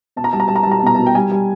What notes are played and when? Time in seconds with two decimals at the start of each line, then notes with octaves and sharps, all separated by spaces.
0.16 B2 A5
0.24 A#5
0.33 G3 A5
0.40 A#5
0.48 G3 A5
0.56 A#5
0.63 A5
0.67 G3 A#5
0.79 A5
0.83 B2 A#5
0.95 B2 A5
1.06 G5
1.15 G3 G#5
1.31 G3